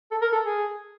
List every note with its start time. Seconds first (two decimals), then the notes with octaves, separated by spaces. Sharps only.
0.11 A4
0.22 A#4
0.32 A4
0.44 G#4